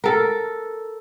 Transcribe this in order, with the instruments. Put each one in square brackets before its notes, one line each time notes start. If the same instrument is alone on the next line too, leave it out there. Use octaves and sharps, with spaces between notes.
[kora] A4 A#4